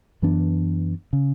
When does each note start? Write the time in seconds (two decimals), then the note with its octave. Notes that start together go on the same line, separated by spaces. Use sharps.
0.22 F#2 E3 B3 D4
1.13 C#3